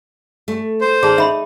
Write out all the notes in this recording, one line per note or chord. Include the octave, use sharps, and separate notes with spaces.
A3
C5
D#3 G#4 D5 A5
D#4 E5 B5 C6